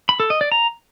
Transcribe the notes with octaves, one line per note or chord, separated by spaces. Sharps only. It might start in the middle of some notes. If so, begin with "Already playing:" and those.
B5
A4
D#5
D5
A#5